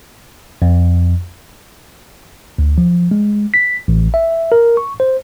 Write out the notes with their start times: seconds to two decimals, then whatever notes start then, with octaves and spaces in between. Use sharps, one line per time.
0.62 F2
2.58 D2
2.78 F3
3.11 G#3
3.54 B6
3.88 A1
4.14 E5
4.52 A#4
4.77 C#6
5.00 C5